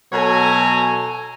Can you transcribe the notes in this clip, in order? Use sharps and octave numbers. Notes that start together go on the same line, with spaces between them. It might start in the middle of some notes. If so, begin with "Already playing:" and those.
B2 F#3 A4 C#5 G#5 A#5